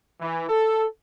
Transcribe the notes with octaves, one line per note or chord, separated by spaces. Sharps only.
E3
A4